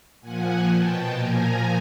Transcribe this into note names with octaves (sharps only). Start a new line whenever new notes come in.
A#2 F3 F#5 G#5
B2 G5 A5
A#2 F3 G#5 A#5